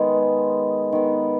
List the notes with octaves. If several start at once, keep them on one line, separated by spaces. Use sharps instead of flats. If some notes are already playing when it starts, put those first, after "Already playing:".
Already playing: D#3 G#3 B3
D#3 B3